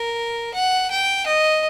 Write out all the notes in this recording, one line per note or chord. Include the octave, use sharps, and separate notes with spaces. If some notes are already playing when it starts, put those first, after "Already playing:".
Already playing: A#4
F#5
G5
D#5